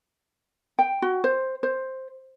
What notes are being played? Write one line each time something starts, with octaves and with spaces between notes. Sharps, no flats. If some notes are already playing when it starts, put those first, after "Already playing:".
G5
F#4
C5
C5